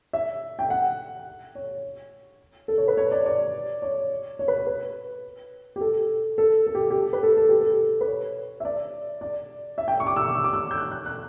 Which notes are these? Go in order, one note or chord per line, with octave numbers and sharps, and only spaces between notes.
E5
G5
F#5
C#5
A4
C#5
B4
C#5
D5
D5
C#5
C#5
B4
C#5
B4
G4
A4
A4
A4
G4
G4
B4
A4
A4
G4
A4
B4
C#5
E5
D5
D5
E5
G5
C#6
D6
E6
D6
C#6
D6
E6
G6
F#6
F#6
F#6